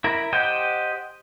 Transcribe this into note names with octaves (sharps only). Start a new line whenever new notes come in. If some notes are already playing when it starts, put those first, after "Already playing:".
E4 A#4
G4 C5 D#5 F#5 G5